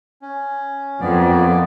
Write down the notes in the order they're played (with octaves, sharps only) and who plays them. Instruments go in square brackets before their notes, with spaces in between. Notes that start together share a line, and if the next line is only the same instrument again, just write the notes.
[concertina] C#4
[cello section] F2 [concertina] A#3 B3 D5